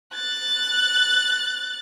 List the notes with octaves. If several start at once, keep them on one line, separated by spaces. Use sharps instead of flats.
F#6 A6